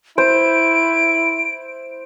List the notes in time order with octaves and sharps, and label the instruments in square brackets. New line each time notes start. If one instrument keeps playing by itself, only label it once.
[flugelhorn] E4 [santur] C5 [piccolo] D7